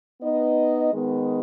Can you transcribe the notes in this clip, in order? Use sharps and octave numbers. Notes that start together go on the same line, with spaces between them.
B3 D#4 B4 D#5
D#3 G#3 B3